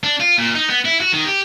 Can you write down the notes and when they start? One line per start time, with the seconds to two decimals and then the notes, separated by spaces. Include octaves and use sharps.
0.04 D4
0.21 F4
0.38 A#2
0.55 D#4
0.70 B3
0.85 E4
1.00 F#4
1.13 D#3
1.25 G4